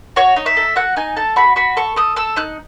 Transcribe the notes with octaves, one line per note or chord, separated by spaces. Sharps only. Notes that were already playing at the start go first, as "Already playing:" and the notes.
F#4 C#5
D#4
E5
A4
F#4 F#5
D#4 G#5
A4 A5
F#4 B5
F#4 B5
A4 C#6
A4 D#6
A4 E6
D#4 F#6